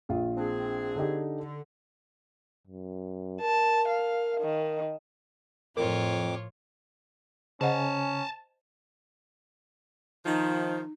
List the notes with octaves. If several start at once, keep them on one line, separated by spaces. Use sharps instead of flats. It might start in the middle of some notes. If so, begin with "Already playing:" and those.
A#1 F4
C4 D4 G#4
D3 D#4 G4
D3
F#2
A#4 A5
F5
D#3
F2 A2 F3 F4 A#4 C#5 D6
C#3 C#4 C5 D#5 F#5 G#5 A5
D#3 F3 D#4